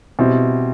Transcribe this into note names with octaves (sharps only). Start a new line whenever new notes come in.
B2 G3 C4 E4